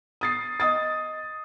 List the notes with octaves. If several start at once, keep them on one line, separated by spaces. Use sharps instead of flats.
D#6 A6 C7
D#5 D#6 A6